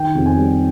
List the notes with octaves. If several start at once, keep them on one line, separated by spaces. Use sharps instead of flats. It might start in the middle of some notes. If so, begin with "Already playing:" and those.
Already playing: D#3 G5
F2
G#5
G3